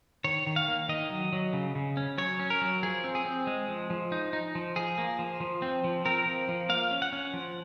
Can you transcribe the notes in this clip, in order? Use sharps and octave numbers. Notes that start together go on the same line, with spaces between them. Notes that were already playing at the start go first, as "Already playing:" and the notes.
D#3 C#5
D#3
F5
A#3
D#3 D#5
F#3
F#3
C#3
C#3
C#4
F#3 C#5
C#4
A#4
F#3
F3 G#4
C4
G#4
C4
G#3
F3
F3
D#4
D#4
F3
F3 G#4
A#3
F3
F3
C4
F3
C4 A#4
F3
F3
A#3 F5
C#4
F#5
C#4
F3